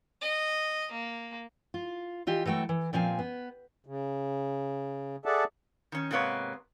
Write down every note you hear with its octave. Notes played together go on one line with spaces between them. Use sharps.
D#5
A#3
F4
E3 F4 G4 D#5
E3 F#3 A3 F#5 G5
E3
A#2 F3 C4 F5 G#5
B3
C#3
G#4 A4 D5 E5 F#5 A5
D#3 C#4
G#2 C3 A#3 B3 C#5